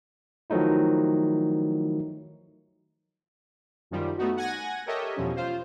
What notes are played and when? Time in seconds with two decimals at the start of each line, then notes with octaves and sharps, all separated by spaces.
0.50 D#3 F3 F#3 A3 D#4 E4
3.91 F#2 D#3 F3 G3
4.18 A3 B3 D#4 F#4
4.37 F#5 G#5 G#6 A#6
4.86 G4 A4 A#4 C#5 D#5 E5
5.16 E2 B2 F3 G3 C#4
5.36 F4 C5